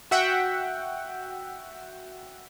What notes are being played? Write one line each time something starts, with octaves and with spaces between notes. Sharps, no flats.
F#4 E5 F#5 G5